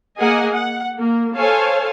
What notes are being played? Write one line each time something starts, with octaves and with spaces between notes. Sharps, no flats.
A#3 G#4 A#4 D#5 F#5 G#5
F#5
A#3
A4 C5 C#5 F5 G#5 A5